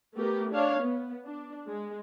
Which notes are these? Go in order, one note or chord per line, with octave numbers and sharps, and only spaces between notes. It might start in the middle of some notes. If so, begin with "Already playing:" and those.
A3 B3 G4 A#4
D4 C#5 F5
B3
D4
G#3